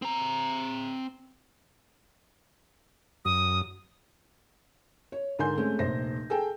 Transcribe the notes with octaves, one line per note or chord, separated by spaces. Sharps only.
C4 A#5
F#2 D#6
C#5
G#2 D3 A#4 G#5 C6 G6
G#3 A3 C4 C#4
F1 A#1 C5 A#6
G#4 A4 G5